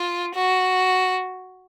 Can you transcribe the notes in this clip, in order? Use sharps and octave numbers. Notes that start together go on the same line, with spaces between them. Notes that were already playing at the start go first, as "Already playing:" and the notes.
Already playing: F4
F#4